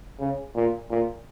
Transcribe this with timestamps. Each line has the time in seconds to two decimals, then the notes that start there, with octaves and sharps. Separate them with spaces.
0.19 C#3
0.55 A#2
0.90 A#2